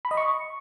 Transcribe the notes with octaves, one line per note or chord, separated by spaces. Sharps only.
B5
D#5
C#6